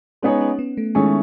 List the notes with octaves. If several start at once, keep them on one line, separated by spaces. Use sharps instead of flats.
G#3 B3 C#4 D#4 G#4 C#5
C#4
B3
A3
D#3 G#3 A3 C#4 E4 G#4